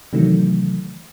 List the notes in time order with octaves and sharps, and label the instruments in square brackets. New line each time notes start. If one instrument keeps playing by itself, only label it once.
[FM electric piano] C3 D#3 E3 F#3 A3